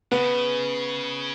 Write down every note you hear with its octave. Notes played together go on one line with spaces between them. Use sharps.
C#3 B3